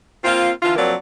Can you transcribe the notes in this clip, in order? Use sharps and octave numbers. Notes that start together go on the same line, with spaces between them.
A#3 C4 F4
D3 E3 F4
F2 F#3 A#3 C4 D5